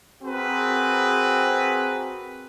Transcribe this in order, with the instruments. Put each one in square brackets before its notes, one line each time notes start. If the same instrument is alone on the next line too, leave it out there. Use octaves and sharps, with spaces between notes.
[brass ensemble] C4 F#4 G#4 A#4 B4